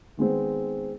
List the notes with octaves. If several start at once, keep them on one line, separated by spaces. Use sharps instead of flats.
D#3 G#3 B3 C4